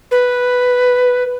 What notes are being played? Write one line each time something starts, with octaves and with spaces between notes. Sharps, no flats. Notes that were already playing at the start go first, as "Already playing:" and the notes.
B4